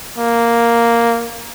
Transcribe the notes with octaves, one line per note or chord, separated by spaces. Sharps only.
A#3